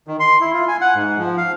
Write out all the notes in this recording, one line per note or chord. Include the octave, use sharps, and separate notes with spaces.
D#3
C6
E4
F4
G#5
F#5
G#2
F3
F5